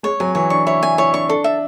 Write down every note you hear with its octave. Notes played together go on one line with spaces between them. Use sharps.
G#3 C#5
F#3 G#5
E3 C#5
D4 C#6
E4 C#5
D4 G#5
E4 C#5
D4 C#6
D4 A4
E5